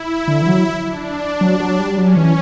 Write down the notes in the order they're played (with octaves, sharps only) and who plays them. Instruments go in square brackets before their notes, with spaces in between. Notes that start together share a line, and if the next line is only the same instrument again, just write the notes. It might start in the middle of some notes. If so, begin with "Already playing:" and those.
Already playing: [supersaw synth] E4
[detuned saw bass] D3
E3
F#3
[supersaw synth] D4
[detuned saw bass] F#3
F#3
G3
[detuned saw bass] F#3 [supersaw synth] C#4
[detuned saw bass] E3